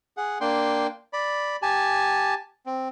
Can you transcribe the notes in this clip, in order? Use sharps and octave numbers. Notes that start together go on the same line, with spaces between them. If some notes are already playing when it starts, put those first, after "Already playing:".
G#4 F#5
A#3 D4 G5 C6
D5 B5
G4 G#5 A5
C4